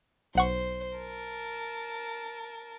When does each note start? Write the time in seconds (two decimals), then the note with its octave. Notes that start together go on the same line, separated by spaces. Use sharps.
0.35 B1 C5 F#5 C#6
0.97 A#4 A5